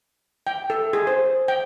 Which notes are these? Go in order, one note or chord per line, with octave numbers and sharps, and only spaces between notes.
G5
A4
G#4
C5
G5